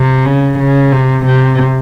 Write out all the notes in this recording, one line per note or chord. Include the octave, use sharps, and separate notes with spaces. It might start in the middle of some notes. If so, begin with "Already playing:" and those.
Already playing: C3
C#3
C#3
C3
C3